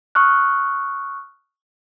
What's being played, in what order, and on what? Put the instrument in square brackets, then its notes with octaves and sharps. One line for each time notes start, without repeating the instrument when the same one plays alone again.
[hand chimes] C#6 D#6 F6 F#6